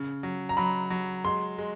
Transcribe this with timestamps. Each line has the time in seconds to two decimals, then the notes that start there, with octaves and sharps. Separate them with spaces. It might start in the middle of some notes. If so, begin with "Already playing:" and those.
Already playing: C#3
0.23 F#3
0.49 A#5
0.57 F#3 B5
0.90 F#3
1.24 G#3 C6
1.58 G#3